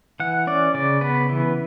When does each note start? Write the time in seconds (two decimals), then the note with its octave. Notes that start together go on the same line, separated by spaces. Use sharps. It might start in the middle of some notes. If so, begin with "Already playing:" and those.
0.20 E3 F#5
0.47 C#4 D5
0.74 C#3 D5
1.01 B3 B4
1.29 E3